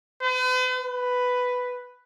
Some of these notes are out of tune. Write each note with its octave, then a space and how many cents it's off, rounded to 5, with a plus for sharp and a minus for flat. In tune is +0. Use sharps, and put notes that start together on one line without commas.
B4 +45
B4 +5